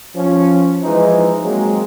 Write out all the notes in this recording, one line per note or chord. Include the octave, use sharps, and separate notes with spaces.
F3 C#4
E3 F3 G#3 D#4
F#3 G#3 A#3 C4